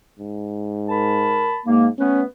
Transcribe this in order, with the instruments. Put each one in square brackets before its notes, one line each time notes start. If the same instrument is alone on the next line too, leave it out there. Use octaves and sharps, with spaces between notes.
[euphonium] G#2
[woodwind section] A#4 A5 B5
[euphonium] G#2 [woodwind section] A#3
[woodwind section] A3 B3 B4 [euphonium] C#4